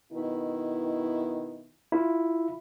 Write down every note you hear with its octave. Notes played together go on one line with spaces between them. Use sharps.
B2 D#3 E4
E4 F4